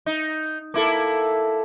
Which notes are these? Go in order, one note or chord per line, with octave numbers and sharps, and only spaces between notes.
D#4
A#3 E4 A4